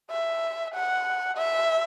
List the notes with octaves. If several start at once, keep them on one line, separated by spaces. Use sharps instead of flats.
E5
F#5
E5